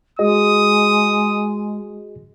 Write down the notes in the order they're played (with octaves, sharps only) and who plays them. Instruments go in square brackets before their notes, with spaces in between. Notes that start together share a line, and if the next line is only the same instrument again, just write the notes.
[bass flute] G#3 [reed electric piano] F#4 G#4 D#5 [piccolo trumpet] D#6